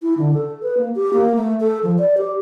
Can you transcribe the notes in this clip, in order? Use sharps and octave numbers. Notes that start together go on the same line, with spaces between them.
E4
D3
A4
B4
A#3
G4
A#3
A3
A4
F3
D5
G4